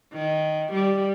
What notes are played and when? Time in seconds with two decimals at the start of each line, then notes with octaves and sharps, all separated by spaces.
0.14 D#3
0.73 G3